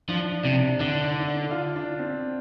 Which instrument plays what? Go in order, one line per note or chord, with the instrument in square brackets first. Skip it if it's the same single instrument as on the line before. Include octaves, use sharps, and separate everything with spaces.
[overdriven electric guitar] F3 [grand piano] D4
[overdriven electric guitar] C3 [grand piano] D4
[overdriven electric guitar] D3 [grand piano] D4
[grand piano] D4
D4
F4
D4
C4